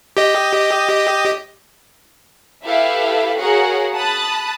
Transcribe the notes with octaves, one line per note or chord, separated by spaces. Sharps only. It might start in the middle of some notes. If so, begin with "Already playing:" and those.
G4 D#5
E4 G4 A4 B4 E5 F5
F#4 G#4 A#4 C#5 F5 F#5
A5 B5 D#6 F#6 A6